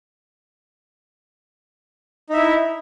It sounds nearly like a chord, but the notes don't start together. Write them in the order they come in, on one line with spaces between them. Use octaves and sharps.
D#4 E5 E4